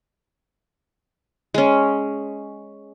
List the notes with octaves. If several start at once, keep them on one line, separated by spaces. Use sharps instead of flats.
G#3 C#4